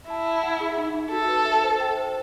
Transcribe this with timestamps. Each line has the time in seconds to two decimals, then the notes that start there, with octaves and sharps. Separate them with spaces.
0.09 E4 A5
0.26 A5
0.43 F#5
0.60 G#4
0.78 D#4
0.94 D#4
1.11 F#4 A4
1.28 B4
1.45 E5
1.63 C5
1.80 G5
1.97 C5